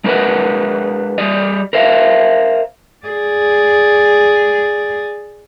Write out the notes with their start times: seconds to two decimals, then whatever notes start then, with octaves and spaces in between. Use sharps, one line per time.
0.04 G#3 D4 A#4 B4 D#5 F#5
1.18 G3 D5 D#5
1.73 A#4 C5 E5 F5
3.06 G#4 D5